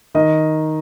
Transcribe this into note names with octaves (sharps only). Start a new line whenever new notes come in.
D#3 D#5